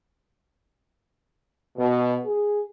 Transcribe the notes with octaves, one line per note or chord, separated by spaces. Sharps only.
B2
G#4